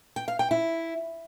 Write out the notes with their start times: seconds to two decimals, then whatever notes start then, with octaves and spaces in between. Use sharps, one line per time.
0.16 G5
0.28 F5
0.39 G5
0.51 E4